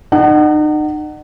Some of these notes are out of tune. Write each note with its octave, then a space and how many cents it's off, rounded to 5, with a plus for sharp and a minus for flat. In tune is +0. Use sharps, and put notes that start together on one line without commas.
D#4 -40 F#5 +20